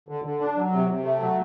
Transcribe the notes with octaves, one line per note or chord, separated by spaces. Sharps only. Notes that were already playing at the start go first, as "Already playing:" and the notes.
D3
D3
D4
F#3
C3
C3
A3
F#3